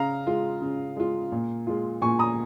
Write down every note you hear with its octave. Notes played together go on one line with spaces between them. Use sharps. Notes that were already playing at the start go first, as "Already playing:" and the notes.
Already playing: C#3 F5 A#5
G#3 F4
C#3
G#3 F4
A#2
G#3 F4
A#2 G#5 C#6
A#5 D#6